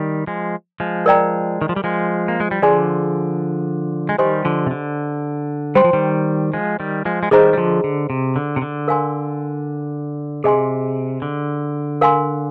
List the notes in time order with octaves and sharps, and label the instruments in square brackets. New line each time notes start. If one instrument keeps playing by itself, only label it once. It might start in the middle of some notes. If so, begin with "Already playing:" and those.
Already playing: [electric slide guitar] D#3 G3
F3 G#3
F3 G#3
[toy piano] A#4 D5 G5 A#5
[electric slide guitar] D#3
F3
G3
F3 G#3
A#3
G#3
G3
[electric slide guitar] D3 F3 [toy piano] G#4 D5 G#5 C6
[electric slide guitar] G#3
[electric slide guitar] D#3 G3 [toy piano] G4 C5 D#5 G#5 C6
[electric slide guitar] D3 F3
C3
D3
[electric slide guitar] G3 [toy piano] C5 G5 C6
[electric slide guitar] F3
D#3 G3
F3 G#3
D#3 G3
F3 G#3
G#3
[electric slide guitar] D#3 G3 [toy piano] G#4 C5 D#5 A#5
[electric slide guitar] G3
D3 F3
D3
C3
D3
C3
D3
[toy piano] A#4 F5 G#5 C6
[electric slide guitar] C3 [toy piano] G#4 D#5 G#5 C6
[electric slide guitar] D3
[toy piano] A#4 F5 G#5 C6